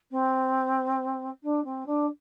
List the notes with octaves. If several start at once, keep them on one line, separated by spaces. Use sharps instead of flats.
C4
D4
C4
D4